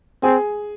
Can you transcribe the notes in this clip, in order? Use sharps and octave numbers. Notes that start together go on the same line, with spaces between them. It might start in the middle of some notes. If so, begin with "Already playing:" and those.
C4 G#4 G#5